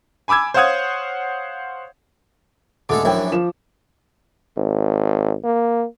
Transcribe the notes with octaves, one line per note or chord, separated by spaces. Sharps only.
G#5 B5 D6 E6 G#6
C5 C#5 F5 F#5 D#6 G#6
D#1 D3 G#3 A3 A4 D6
A#1 F#2 E4 C#5 G5
F3 E7
G#1
A#3